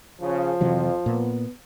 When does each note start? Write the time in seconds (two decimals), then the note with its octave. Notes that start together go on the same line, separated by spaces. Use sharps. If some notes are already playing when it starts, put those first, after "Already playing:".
0.21 C#3 F3
0.61 F2 C3 E3 F#3
1.06 A#2 B3